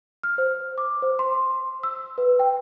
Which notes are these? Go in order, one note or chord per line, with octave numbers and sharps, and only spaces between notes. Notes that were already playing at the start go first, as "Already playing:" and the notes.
F6
C5
D6
C5
C6
E6
B4
G5